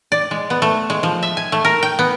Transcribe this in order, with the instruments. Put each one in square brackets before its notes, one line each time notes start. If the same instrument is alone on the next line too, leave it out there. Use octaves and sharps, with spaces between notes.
[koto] D5
G#3
B3
A3
G#3
F3
E5
G#5
A3
A#4
G5
B3